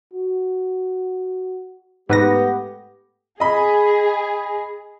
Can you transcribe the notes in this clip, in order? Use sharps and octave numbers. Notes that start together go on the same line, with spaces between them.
F#4
G#2 A3 B3 G4 B4 A#6
G#4 D#5 B5